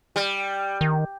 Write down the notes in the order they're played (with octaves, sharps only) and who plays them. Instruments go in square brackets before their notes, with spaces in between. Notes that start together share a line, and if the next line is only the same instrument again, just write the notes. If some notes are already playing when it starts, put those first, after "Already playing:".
[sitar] G3
[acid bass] D#3